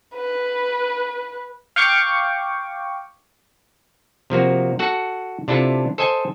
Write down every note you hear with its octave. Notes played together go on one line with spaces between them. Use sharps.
B4
F5 G5 C#6 D6
C3 F3 A#3 F#4
F#4 A4 F#5
C3 D4 E4 F4 A4
A4 C5 D#5 G#5